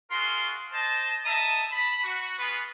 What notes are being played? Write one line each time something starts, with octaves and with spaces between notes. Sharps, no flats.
F4 F#4 G#4 A#4 C6
C5 D#5 A5
D#5 E5 A5 A#5 D#6
B5
F#4
B3 F4 G#4 B4